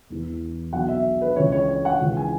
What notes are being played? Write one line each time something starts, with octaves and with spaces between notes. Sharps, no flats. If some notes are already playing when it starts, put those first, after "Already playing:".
E1 E2 E3
B1 B2 F#5
E5
B4
C#2 C#3 E3 C#5
C#5
C#5
F#5
C#2 C#3 E3
G#5